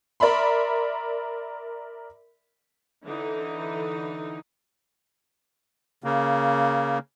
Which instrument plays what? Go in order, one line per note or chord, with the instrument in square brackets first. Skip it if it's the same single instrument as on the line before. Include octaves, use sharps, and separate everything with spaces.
[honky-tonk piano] A#4 D5 E5 B5 C6
[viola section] D3 E3 D#4
[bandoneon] C#3 A#3